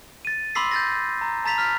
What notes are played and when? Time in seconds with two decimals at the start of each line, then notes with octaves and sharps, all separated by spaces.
0.25 A6 D#7
0.55 B5 C6 D6 E6 B6 C7
0.71 G6 A6 A#6
1.21 A#5
1.45 A5 A#5 A6 B6 F7
1.58 F6 B6